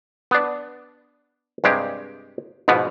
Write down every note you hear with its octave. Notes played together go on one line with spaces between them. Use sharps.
B3 D4
G2 C3 G#3 G4
G#2 B2 F3 B3